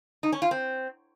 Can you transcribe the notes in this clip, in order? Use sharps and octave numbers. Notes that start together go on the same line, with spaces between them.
D#4
C#4
F4
C4